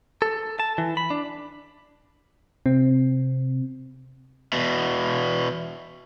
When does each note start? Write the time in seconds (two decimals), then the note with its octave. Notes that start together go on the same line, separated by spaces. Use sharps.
0.22 A4
0.60 A5
0.78 E3
0.97 B5
1.10 D4
2.66 C3 C4
4.53 E2 B2